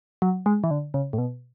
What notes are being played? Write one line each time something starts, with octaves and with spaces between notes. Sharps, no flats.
F#3
G#3
E3
D3
C#3
A2
B2